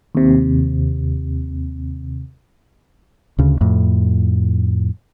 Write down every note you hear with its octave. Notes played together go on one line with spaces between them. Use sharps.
D#2 C3
D2 C#3
F2 A2